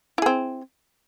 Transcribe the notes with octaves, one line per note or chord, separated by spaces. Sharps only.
C4 E4 G#4